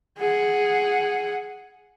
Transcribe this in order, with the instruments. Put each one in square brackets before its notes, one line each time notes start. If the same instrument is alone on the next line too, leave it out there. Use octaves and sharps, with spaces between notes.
[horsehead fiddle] G#4 F#5